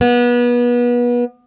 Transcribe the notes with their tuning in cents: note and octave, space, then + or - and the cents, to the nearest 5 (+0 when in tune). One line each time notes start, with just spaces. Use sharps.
B3 -30